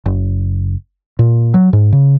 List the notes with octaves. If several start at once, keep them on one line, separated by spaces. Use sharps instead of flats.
F#1
A#2
F#3
G#2
C#3